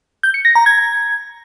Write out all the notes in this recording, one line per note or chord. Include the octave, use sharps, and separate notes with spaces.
G6
C#7
A#6
A#5
G#6